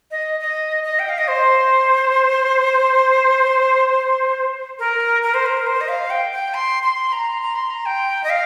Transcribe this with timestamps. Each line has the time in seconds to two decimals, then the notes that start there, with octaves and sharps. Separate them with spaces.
0.11 D#5
0.40 D#5
0.84 D#5
0.99 G5
1.09 F5
1.18 D#5
1.28 C5
4.79 A#4
5.23 A#4
5.34 C5
5.46 A#4
5.67 C5
5.81 D#5
5.88 F5
6.10 G5
6.32 G5
6.54 C6
6.83 C6
7.12 A#5
7.42 A#5
7.56 C6
7.70 A#5
7.86 G5
8.24 D#5
8.30 F5